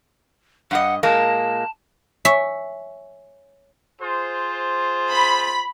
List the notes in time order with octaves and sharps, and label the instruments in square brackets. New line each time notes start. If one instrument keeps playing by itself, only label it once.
[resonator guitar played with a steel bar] G2 D#5 [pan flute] F#5
[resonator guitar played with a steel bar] A#2 G#3 A#3 [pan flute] A5
[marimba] C#5 G#5 C#6 [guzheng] E5
[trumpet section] F4 G#4 C5
[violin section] B5